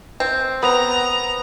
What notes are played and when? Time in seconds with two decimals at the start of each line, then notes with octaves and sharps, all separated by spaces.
0.20 C4
0.62 B3 A#5